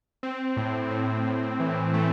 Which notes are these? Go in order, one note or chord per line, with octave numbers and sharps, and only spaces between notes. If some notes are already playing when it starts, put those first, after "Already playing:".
C4
A2
A2
A2
E3
A3